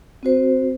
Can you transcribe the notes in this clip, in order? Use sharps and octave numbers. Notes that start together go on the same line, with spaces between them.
C4 F#4 C5